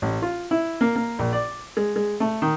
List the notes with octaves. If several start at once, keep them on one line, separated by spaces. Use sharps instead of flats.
A1
F4
E4
A#3
A#3
A#1
D5
G#3
G#3
A3
D#3